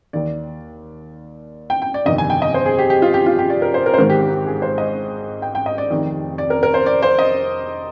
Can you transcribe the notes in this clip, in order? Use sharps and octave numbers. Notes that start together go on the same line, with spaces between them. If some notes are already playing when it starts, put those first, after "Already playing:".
D#2 D#3 D5
G5
G5
D5
G1 F2 C3 D#3 D#5
G#5
G5
D#5
C5
G#4
G4
G4
F4
G4
F4
G4
D5
A#4
C5
A#4
C5
G#1 G#2 D#3 A#4
G4
G4
G#4
C5
D#5
G5
G5
D#5
D5
F1 F2 D#3
D5
A#4
A#4
C5
D5
C5
D#5